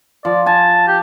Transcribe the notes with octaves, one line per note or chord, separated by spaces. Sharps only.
F3 D5
G#5 A5
G4